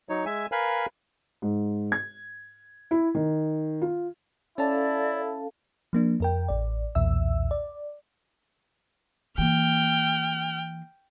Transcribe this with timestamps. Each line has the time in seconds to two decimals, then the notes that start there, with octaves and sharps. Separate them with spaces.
0.09 F#3 D#4 C#5
0.26 G#3 E5 G#5
0.52 A#4 B4 F5 G#5 B5
1.42 G#2
1.92 G#6
2.91 E4
3.15 D#3
3.82 F4
4.58 C#4 E4 A4 D5 F5 A5
5.93 F3 A#3 D4
6.20 F2 A#4 G5
6.49 A1 D5
6.95 B1 E2 A#2 E3 E5 E6
7.51 D5
9.38 E3 A#3 G5 F6